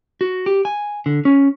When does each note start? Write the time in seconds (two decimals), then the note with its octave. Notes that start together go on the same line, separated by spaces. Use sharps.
0.21 F#4
0.46 G4
0.65 G#5
1.06 D3
1.25 C#4